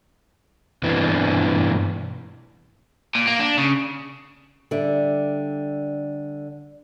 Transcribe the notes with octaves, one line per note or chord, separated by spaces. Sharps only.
G2 B2 E3 C4 D4
A#2
A#3
D4
C#3
D3 G3 D5 E5